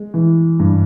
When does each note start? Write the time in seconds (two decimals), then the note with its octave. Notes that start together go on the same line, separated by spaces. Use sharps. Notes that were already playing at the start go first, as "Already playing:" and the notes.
Already playing: G#3
0.14 E3
0.60 G2